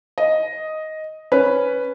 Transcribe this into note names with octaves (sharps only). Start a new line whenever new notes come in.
D#5
C#4 B4